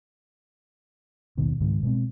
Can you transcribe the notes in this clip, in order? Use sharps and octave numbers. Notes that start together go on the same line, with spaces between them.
A#1 D#2 B2 D#3
C#2 G#2 D#3 G#3
B2 G#3 C4